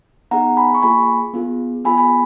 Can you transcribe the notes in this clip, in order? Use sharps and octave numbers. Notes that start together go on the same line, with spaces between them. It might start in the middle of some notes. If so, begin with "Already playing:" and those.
B3 D#4 G#4 F#5 A#5
G#5 B5
C#6
A#3 F4 G#4 G#5 B5
B3 F4 G#4
B3 F4 G#4 G#5 B5
G#5 B5